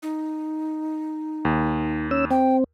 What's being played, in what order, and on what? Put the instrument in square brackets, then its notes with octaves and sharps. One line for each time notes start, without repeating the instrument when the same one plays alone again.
[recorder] D#4
[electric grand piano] D#2
[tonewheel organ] C#4 E6
[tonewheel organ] C4 [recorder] G5